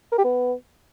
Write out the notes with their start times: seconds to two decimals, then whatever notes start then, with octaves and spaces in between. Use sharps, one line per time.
0.12 A#4
0.18 G4
0.25 B3